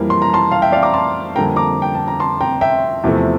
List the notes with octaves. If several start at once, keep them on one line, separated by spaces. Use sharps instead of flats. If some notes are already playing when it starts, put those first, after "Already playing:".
Already playing: F2 E3 G3 A#3
C6
A#5
A5 C6
F5 A5
E5 G5
D5 F5
A#5 D6
A5 C6
F2 D3 G3 A#3 G5 A#5
A#5 D6
G5
A5
A#5
A5 C6
G5 A#5
E5 G5
E2 C3 F3 A3